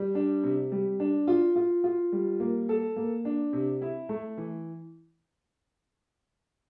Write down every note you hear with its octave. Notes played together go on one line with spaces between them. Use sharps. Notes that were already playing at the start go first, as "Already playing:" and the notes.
Already playing: G3
D4
C3
G3
D4
F4
F4
F4
G3
A#3
A4
A#3
D4
C3
E4
A3
E3